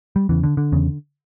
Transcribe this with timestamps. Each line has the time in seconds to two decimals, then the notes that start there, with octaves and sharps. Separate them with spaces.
0.16 G3
0.29 E2 C#3 E3
0.43 D3
0.57 D3
0.72 E2 C#3